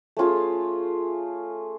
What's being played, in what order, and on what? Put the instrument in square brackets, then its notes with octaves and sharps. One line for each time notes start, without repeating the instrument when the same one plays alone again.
[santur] A3 C#4 F4 G#4